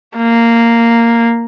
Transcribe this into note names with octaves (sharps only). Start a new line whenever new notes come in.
A#3